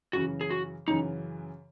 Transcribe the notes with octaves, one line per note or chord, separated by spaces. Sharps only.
F#2 C#3 E3 F#4
G#4
F#4
F#2 C#3 E3 D#4